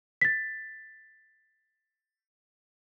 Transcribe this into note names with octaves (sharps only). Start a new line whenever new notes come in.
A6 B6